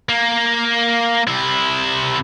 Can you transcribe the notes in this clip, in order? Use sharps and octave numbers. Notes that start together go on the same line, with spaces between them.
A#3
C3 E4